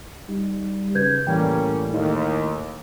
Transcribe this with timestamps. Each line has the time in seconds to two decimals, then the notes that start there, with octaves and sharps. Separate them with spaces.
0.29 G3 D#4
0.95 C#3 B4 G6 G#6
1.27 A2 E3 G3 A#3 C#4 G5
1.92 D#2 D#4 E4 D#5